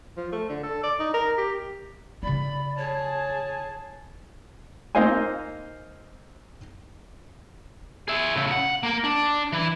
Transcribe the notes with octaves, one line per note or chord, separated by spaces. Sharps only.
F3
A3
D3
A4
D5
D#4
A#4
G4
C#3 E4 D5 B5
G#4 C#5 A5
A#3 C4 D#4 C5 F5 G#5
G#4 E5
A2 C#3
F#5
A#3 A#4
D4
E3 E4